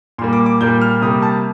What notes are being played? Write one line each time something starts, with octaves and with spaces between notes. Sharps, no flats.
A#2 G3 A#3 C6
D6
D6
A#2 G3 A#3 G6
F6
C3 G3 A#3 D#6
A5